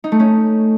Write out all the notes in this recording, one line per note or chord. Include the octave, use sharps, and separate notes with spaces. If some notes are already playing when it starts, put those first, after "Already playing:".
D#4
A3
C#4